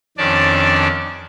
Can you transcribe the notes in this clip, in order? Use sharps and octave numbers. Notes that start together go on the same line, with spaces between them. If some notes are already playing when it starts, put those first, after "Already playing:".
F2 D#3 C#4 D4 D5 A5